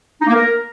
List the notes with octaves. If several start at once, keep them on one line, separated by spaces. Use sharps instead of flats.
D#4
A#3
A#4